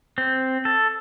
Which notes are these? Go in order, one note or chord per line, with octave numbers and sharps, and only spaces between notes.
C4
A4